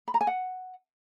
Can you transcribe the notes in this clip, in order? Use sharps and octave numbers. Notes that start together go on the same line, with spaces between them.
B5
A#5
G#5
F#5